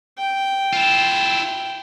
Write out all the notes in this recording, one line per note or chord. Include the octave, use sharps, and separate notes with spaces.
G5
E4 F4